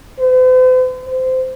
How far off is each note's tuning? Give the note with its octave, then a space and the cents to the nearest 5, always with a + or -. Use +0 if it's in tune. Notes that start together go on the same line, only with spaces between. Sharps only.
C5 -45
C5 -20